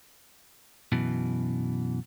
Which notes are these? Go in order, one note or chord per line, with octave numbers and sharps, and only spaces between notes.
F#2 B2 E3